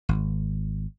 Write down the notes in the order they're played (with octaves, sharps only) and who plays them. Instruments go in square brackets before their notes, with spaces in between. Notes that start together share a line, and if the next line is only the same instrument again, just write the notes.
[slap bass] G#1